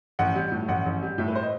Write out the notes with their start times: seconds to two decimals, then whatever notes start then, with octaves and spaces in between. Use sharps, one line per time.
0.19 A1 F#5
0.35 G3
0.52 A2
0.68 A1 F#5
0.86 A1
1.03 G3
1.18 A2 E5
1.28 B4
1.35 C5
1.43 D#5